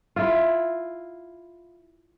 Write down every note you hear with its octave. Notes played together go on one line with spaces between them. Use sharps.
E4 F4